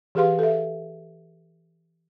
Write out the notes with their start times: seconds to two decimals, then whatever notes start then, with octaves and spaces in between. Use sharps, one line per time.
0.15 E3 G4 G#4 B4 F5 C6
0.39 A4 E5